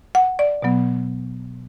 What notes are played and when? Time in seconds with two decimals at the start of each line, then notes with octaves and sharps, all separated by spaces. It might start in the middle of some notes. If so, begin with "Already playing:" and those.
0.15 F#5
0.39 D5
0.62 B2 F#3 B3